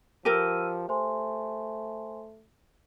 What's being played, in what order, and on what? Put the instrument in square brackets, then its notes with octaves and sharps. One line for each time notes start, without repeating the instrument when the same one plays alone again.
[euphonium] F3 [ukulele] G4 A#4 [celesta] E6 F6 D#7
[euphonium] A3 [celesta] C5 G#5 C6